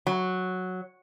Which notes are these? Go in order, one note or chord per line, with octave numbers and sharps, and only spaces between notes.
F#3